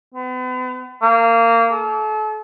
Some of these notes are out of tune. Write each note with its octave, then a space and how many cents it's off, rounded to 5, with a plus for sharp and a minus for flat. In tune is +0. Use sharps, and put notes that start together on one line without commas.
B3 +40
A#3 -20
A4 -35